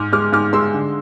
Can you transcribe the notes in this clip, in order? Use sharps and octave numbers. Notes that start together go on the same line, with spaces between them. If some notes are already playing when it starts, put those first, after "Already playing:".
Already playing: G#2 D6 F6
G#3 D6 F6
G#2 D6 F6
G#3 C6 E6
D3